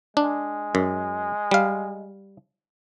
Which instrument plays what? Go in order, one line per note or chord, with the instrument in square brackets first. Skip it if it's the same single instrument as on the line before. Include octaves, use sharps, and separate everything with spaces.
[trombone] G#3 [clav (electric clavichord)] D4
[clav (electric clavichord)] F#2
G3 F5